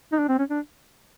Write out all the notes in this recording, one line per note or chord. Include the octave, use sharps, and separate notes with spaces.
D#4
D4
C4
C#4
D4